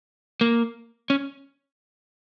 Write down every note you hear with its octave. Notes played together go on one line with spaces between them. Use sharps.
A#3
C#4